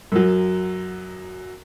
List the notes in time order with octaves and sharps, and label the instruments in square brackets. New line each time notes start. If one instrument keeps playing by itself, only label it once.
[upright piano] F#2 F#3